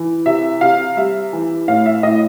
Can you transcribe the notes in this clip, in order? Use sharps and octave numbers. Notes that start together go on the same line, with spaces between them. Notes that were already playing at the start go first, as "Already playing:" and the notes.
Already playing: E3
C3 E5
C3 F5
G3 E5
E3
A2 F5
E5
A2 D#5